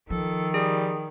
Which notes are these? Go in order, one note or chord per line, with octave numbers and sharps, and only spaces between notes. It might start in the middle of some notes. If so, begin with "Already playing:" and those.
D#3 F3 A4
G3 G#4